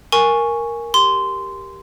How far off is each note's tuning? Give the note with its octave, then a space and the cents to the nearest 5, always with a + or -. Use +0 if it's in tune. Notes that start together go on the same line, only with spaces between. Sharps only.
A#4 +0 G#5 +0 C#6 +0
G4 +0 C6 -15